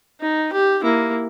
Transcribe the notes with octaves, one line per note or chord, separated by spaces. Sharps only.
D#4
G4
A#3 E4